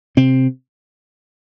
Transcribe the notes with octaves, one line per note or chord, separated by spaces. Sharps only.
C3 C4